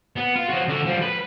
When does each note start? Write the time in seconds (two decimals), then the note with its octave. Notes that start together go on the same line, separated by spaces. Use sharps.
0.16 B3
0.35 F4
0.49 F3 F#4
0.68 D3 F#4
0.86 F3 G3
1.02 B4